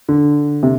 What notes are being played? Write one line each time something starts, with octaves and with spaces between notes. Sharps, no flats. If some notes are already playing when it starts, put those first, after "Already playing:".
D3
C3